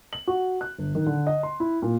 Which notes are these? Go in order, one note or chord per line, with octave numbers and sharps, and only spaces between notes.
F#7
F#4
F#6
G1
D#3
D3
D#5
C6
E4
A#2